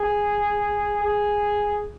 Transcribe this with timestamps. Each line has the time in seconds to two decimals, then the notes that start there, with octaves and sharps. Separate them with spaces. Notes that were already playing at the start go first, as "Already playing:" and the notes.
Already playing: G#4
1.03 G#4